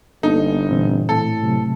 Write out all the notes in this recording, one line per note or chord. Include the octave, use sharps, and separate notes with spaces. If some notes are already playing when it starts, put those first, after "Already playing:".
G1 A#3 B3 D#4 A4
A#2 E3 C4
A2 A4
C3 F#3 A3